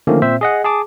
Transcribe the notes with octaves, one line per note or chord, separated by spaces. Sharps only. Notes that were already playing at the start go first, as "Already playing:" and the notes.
D3 D#3 F3 A3 A#3 C#4
A#2 C4 C5 E5
G#4 D#5 F#5
G#4 A5 D6